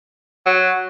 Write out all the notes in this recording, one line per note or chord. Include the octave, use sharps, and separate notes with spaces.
F#3